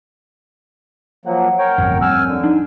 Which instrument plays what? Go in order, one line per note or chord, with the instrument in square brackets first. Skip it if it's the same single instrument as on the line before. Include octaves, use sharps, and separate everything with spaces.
[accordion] F3 F#3 A#3 [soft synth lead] F#5
[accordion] A#4 C#5 G5
[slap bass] D1 G1 F2
[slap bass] F2 G3 [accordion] G#5 E6 F6
[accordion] D3
[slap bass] D4 [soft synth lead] D#4